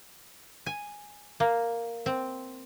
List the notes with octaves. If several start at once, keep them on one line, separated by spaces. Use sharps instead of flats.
G#5
A#3
C4